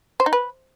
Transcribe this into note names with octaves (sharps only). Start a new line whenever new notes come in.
C5
D#4
B4